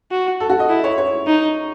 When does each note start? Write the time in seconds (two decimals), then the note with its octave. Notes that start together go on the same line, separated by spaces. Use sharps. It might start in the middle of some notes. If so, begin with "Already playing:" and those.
0.12 F#4
0.40 A4
0.50 F#4
0.59 D#5
0.70 E4
0.84 C#5
0.98 C#5
1.27 D#4